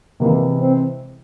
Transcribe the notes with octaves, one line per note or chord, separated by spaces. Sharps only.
C3 E3 G#3 A#3 E4
C4